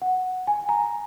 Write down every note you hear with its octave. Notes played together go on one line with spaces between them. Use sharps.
F#5
G#5
A#5